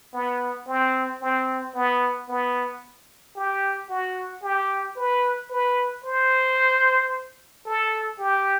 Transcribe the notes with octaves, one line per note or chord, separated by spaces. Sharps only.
B3
C4
C4
B3
B3
G4
F#4
G4
B4
B4
C5
A4
G4